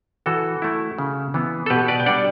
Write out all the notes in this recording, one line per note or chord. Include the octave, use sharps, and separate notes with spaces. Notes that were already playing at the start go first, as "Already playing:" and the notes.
E3 F#4 A4
A3 E4
C#3
E3 B3
A4
B2 G4 B4
B4 D5
G5
G3 D4 D5 F#5